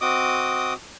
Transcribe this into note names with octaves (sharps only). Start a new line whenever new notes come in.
C4 F#4 D#5 D6 D#6